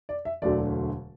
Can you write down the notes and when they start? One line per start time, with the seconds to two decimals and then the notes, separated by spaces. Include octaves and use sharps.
0.09 D5
0.25 E5
0.42 E1 D2 D3 F#3 A3 D5